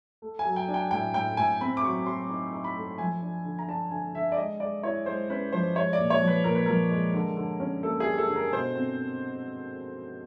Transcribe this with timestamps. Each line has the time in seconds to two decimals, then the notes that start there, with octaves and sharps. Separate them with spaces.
0.22 A3
0.39 G#5
0.45 F#3
0.56 G5
0.68 D4
0.74 G5
0.91 A2 G5
1.14 A2 G5
1.37 A2 G#5
1.61 C4 B5
1.77 D6
1.84 F#3 C#6
2.06 F#3 C6
2.29 D#4
2.53 D#4
2.64 B5
2.76 A3
2.98 F3 G#5
3.23 D4
3.45 D3
3.59 A#5
3.68 D4 A5
3.91 D3 G#5
4.14 D3 E5
4.32 D5
4.37 G#3 D#5
4.60 G#3 D5
4.83 E4 C#5
5.06 G#3 C5
5.30 C#4 B4
5.52 F3 C5
5.76 G#3 C#5
5.93 D5
5.98 A#2
6.10 C#5
6.22 F3
6.27 B4
6.44 A#2 A#4
6.55 B4
6.66 F3 A#4
6.91 G#3
7.14 D3
7.37 D3
7.60 C#4
7.83 A#3 A4
8.00 G#4
8.06 G3
8.18 A4
8.29 D3
8.36 A#4
8.53 B2 C5
8.75 C4